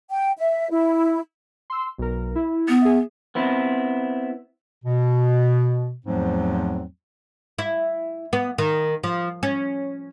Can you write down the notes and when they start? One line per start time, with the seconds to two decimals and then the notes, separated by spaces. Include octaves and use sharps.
0.10 G5
0.38 E5
0.71 E4
1.70 C6 E6
1.98 B1 A#4
2.35 E4
2.68 B3
2.82 G#4 E5
3.35 B3 C4 E4
4.85 B2
6.07 E2 G#2 F3 F#3 A3 C4
7.59 E4
8.33 B3
8.58 D#3
9.03 F3
9.43 C#4